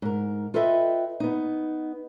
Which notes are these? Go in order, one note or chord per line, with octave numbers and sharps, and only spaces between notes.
G#2 A#4
F4 A4 B4 D#5 E5 G5
B3 D#4